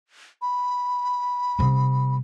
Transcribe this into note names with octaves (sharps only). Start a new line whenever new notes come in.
B5
C3 G3